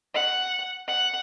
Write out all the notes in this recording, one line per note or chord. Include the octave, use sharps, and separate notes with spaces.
F#5
F#5